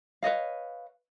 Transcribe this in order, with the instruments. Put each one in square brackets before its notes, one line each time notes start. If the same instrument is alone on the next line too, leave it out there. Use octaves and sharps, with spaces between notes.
[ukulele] B4 C#5 D#5 F5